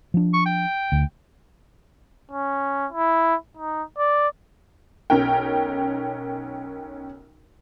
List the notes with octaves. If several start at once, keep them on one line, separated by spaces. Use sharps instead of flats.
F3 D4
C#6
G5
D2
C#4
E4
D#4
D5
B1 C#4 A#4 G5